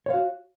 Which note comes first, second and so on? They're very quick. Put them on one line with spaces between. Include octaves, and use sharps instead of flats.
C#5 F5 F#4